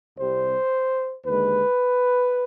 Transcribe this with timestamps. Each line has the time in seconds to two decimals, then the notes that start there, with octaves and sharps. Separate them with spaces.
0.18 C2 C3 G3 C5
1.25 D#2 D3 G#3 B4